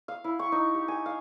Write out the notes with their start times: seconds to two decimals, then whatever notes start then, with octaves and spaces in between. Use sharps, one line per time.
0.08 F5
0.24 E4
0.39 C#6
0.52 D#4
0.74 G4
0.88 G#5
1.06 F5